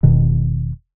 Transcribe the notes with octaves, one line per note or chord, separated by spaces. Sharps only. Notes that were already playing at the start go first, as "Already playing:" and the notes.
E1 B2 D#3